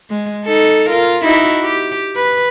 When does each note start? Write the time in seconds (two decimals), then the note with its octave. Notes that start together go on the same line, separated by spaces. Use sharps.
0.10 G#3
0.45 D#4 A4
0.89 F4 A#4
1.23 D#4 E4 F#4
1.63 G4
2.15 B4